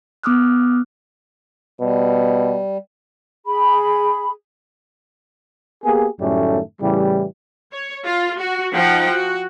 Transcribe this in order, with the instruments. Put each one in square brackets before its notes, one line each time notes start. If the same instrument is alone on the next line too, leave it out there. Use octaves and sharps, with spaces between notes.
[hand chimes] B3 D6 D#6 F6 F#6
[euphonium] B2 [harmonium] G3
[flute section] G#4 B5
[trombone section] A#3 B3 G4 G#4
F#2 A2 D#3 G3 A3 C#4
A2 C#3 E3 G3
[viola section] C#5
F4
F#4
F3 D#4 F#5 G5
F#4